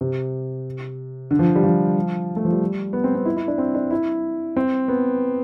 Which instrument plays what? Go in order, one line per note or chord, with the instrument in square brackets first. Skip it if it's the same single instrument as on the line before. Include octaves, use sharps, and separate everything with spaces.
[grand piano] C3
D3
F3
G3
F3
A3
F3
G3
B3
C4
C4
E4
E4
D4
C4
D4
E4
C4
B3